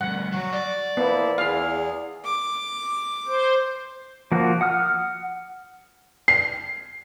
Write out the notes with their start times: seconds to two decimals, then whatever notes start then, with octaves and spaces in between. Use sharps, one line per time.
0.01 D2 G2 F#5
0.32 F#3 F#4
0.53 D5
0.97 F3 A#3 B3 E4
1.38 E2 E4 G#4 F5
2.25 D6
3.27 C5
4.32 F3 A#3 F#4
4.61 F#5 D#6 F6
6.28 C7